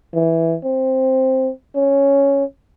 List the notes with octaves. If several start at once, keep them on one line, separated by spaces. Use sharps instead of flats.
E3
C4
C#4